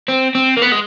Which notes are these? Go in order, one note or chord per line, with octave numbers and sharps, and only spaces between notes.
C4
C4
A#3
B3
G#3